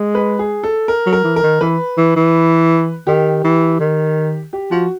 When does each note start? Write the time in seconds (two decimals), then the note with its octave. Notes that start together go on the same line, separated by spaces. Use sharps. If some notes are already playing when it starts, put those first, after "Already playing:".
Already playing: G#3
0.15 B4
0.39 G#4
0.64 A4
0.88 A#4
1.06 F#3
1.13 A#4
1.24 E3
1.36 A#4
1.43 D#3
1.61 E3 B4
1.97 E3
2.16 E3
3.07 D#3 G4
3.44 E3
3.80 D#3
4.53 G4
4.71 F3 F#4